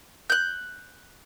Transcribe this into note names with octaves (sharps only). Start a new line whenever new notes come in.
F#6 G6